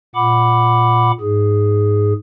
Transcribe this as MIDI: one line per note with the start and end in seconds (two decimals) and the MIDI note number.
0.15 1.12 46
0.15 1.12 78
0.15 1.12 83
0.15 1.12 86
1.20 2.13 44
1.20 2.13 68